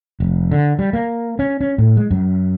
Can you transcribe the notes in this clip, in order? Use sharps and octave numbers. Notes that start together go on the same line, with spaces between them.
F1
D3
G3
A#3
C#4
C#4
A2
G#3
F#2